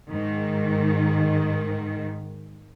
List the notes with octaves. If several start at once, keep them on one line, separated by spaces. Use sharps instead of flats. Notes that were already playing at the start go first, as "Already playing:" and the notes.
G#2 D#3